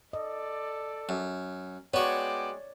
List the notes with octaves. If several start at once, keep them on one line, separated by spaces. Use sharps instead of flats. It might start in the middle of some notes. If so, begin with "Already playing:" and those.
A4 D5 D#5
F#2
G#3 B3 F#4 C#5 D5 G5 D6